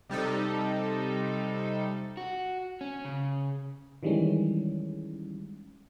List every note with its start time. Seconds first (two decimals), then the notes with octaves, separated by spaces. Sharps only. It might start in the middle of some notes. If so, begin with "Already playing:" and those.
0.10 C3 G3 D#4 A4
2.17 F#4
2.81 C#4
3.05 C#3
4.03 D#3 E3 G3 G#3 C#4